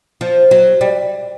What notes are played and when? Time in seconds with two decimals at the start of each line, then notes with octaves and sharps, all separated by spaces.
0.21 F3
0.51 F#3
0.81 G3